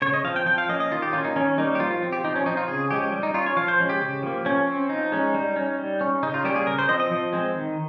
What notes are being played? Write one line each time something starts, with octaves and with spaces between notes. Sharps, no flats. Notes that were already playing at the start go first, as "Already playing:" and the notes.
C#3 C#5
D#5
F3 C4 F5
G5
F3 G5
F5
A#3 C#4 D#5
D#5
D#3 F4
G4
A#3 C#4 F4
D#4
D#3 C#4
G3 A#3 C#4 D#4
G4
F3 F4
F4
C4
G4
F3 D#4
C#4
C4 D#4
F4
C#3 G#4
F3 G#3 C#4 G4
G3
D#4
C#4 F4
C#5
F3 F5
C5
G#3 C#4
G4
C#3
F3 A#3
F3 C#4
C4
F3 D#4
G#3 C#4
G3
C#4
G3
C#4
C#3 D#4
F4
G3 A#3 C#4 G4
G#4
C#3 A#4
C5
F3 C4 D#5
D#5
F3
G#3 C4
D#3